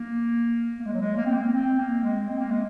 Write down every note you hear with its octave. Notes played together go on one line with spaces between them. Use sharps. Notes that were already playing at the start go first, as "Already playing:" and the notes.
Already playing: A#3
A#3
G#3
F#3
G#3
A#3
C4
A#3
C4
A#3
G#3
C4
A#3
G#3